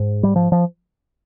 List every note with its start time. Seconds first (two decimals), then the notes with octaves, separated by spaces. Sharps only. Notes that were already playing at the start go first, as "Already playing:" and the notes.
Already playing: G#2
0.23 G3
0.36 F3
0.52 F3